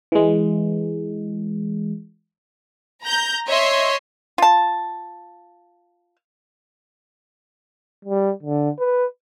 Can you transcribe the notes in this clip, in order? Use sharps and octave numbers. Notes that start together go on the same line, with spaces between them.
E3 G#3
A#5 G6
C#5 D#5 E5 C6
F4 A5
G3
D3
B4